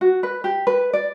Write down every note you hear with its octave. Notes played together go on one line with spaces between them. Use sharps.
F#4
B4
G4
B4
D5